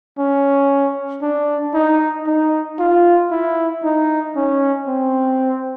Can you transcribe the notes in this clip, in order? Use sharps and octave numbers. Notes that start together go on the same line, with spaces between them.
C#4
D4
D#4
D#4
F4
E4
D#4
C#4
C4